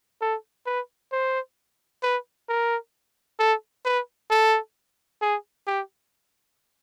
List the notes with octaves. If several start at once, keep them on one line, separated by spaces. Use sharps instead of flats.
A4
B4
C5
B4
A#4
A4
B4
A4
G#4
G4